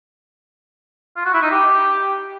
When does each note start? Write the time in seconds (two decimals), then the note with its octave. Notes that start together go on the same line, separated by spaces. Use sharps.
1.16 F4
1.25 F#4
1.34 E4
1.42 D#4
1.51 G4